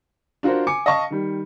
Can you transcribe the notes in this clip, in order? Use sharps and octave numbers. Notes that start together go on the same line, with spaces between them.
D4 F4 F#4 A#4 C5
G#5 D6 C#7
D#5 F5 A5 C#6
D#3 G3